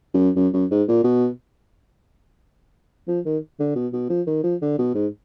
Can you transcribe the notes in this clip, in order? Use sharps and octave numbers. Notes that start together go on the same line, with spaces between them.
F#2
F#2
F#2
G#2
A#2
B2
F3
D#3
D3
B2
B2
F3
D#3
F3
D3
B2
G#2